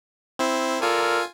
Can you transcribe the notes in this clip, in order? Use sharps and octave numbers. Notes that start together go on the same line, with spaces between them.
C4 E4 C5
F4 A4 A#4 D5 G#5